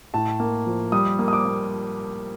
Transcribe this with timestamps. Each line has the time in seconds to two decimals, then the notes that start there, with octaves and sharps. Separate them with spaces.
0.14 A2 A5
0.40 A#3
0.67 F3
0.92 G3 D#6
1.19 A#3
1.28 D#6
1.33 D6
1.46 A#3